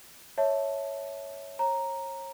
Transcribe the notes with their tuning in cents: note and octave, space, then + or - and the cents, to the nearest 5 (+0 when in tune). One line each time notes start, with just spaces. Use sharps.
C#5 +0 E5 -15 A5 +0
C#5 -35 A#5 +0